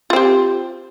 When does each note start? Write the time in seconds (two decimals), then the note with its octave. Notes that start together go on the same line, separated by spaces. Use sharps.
0.10 F4
0.13 C4
0.16 G4